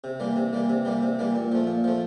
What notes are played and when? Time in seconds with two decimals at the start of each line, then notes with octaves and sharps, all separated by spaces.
0.04 C3
0.20 E3 G3 A#3
0.36 C3
0.53 E3 G3 A#3
0.70 C3
0.85 E3 G3 A#3
1.02 C3
1.19 E3 G3 A#3
1.35 A#2
1.52 F3 A3
1.67 A#2
1.84 F3 A3